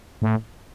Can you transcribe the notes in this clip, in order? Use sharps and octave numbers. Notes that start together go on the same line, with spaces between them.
A2